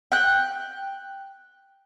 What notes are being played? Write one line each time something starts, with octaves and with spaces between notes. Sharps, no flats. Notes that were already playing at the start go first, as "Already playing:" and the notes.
G5 F#6